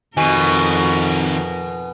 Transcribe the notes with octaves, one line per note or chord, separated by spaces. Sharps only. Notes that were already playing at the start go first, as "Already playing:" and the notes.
F2 B2 D#3 C4 A#4 G#5 D#7